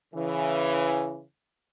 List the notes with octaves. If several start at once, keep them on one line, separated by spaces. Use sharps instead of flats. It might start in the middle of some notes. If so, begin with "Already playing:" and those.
C#3 E3